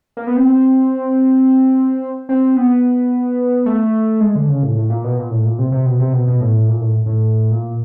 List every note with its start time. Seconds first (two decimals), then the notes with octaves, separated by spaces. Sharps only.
0.17 A#3
0.27 B3
0.37 C4
2.29 C4
2.57 B3
3.66 A3
4.21 G#3
4.35 D3
4.49 C#3
4.63 A2
4.77 A2
4.90 A#2
5.04 B2
5.18 A#2
5.31 A2
5.45 A#2
5.59 C3
5.72 C3
5.86 B2
5.99 C3
6.13 B2
6.28 B2
6.41 A2
6.69 A#2
6.81 A2
7.06 A2
7.51 A#2